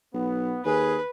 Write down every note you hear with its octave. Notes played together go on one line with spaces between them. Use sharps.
B1 B3
D#2 G#4 B4